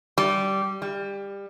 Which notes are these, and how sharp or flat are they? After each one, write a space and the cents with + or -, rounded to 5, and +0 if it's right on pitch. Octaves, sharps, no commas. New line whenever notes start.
G3 -15
G3 +20